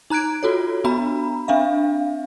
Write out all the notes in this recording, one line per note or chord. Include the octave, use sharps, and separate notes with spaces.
D#4 A#5 F#6 G#6 D7
F4 F#4 A4 C#5
B3 D4 F#4 A#5 B5
C4 D4 E5 F5